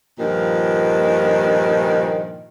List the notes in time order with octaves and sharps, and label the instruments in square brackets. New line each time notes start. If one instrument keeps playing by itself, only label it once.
[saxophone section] G2 A#2 D#3 F3